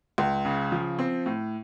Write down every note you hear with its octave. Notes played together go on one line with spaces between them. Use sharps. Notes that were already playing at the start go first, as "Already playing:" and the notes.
C#2
C#3
F3
C4
A2